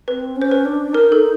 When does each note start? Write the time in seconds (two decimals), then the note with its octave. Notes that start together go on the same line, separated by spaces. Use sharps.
0.08 C4 B4
0.36 C#4
0.42 C5
0.51 B4
0.65 D4
0.93 D#4 A#4
1.12 A4